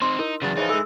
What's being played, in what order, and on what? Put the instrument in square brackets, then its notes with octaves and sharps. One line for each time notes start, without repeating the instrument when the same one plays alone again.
[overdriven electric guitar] C4 D#4 [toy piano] C6
[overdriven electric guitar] D#4 [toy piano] E4 A#4
[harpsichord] E2 A5 [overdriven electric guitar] C#3 F#3
[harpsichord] C#3 E3 F3 [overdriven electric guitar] D#4
[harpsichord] E3 G#3 [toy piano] A4 G#5 E6